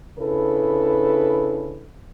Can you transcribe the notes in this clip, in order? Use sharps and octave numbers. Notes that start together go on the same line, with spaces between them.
C#3 D4 E4 A4 B4